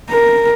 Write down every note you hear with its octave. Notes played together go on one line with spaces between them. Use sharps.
A#4